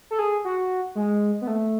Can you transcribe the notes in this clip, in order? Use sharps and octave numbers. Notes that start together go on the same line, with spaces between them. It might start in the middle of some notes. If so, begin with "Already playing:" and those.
A4
G#4
F#4
G#3
B3
A3